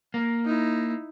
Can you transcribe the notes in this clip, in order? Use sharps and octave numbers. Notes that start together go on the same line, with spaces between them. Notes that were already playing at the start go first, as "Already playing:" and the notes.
A#3
D#4 E4